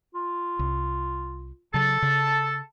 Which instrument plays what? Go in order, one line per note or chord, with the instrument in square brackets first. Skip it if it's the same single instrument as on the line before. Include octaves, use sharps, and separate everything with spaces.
[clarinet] F4
[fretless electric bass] C2
[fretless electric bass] C#3 F#3 [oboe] A4 [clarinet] A5
[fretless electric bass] C#3